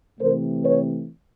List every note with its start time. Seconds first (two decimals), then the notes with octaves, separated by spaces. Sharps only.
0.19 C3 E3 A3 C4 A#4 C5
0.64 B4 C#5